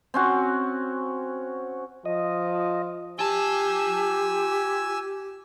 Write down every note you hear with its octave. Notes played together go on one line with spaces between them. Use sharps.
C4 C#4 F#4
F3 D#5
F4 G4 G#5 A5 E6